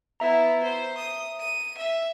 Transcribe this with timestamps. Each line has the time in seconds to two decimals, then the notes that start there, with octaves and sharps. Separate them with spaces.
0.20 B3 E4 E5 A#5
0.63 C5
0.97 D#6
1.39 D#7
1.77 E5